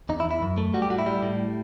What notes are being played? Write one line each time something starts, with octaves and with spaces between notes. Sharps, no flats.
E2 D#4
E4
E2
E4
F#2
A3
G3 F#4
G4
A2 F#4
E4
G3
A2